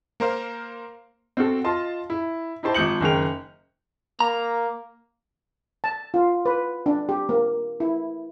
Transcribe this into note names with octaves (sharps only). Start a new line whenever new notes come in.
A#3 A#4 C5 F5
C4 F#4 A4
F4 D#5 A5 C6
E4
D#4 E4 G4 C5 A5
G#1 F3 D#6 G6 C#7 F#7
F#1 D#3 G#4 A#4 G5 F7
A#3 A#5
A5
F4
B4
D4
G4
A#3
E4